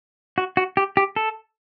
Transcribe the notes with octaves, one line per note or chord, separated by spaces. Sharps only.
F#4
F#4
G4
G4
A4